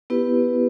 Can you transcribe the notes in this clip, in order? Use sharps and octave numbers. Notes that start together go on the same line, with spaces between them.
B3 E4 G4 B4